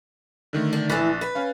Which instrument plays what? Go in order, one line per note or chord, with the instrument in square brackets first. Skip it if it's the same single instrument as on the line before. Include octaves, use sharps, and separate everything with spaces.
[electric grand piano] D3 D#3 A3
[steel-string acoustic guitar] D4
[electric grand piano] A#1 F#6 A6 [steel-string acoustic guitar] E3 A3
[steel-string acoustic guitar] B4
[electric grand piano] C#4 F5